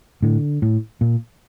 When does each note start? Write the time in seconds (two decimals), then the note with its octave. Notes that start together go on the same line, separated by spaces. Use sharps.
0.22 A2 D3
0.62 A2
1.01 A#2